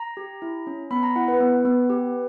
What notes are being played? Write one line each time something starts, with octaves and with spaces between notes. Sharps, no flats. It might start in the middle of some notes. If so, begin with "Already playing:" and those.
Already playing: A#5
G4
E4
C#4
B3 B5
A#5
E4 F#5
B4
B3
B3
G4